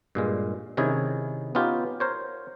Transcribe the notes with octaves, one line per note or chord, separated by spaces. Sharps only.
G2 A#2 G#3
C3 D#3 C#4 E4 G#4
B3 C#4 D#4 F4 G4
A#4 C5 C#5